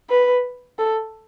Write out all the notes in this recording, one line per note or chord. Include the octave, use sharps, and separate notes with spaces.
B4
A4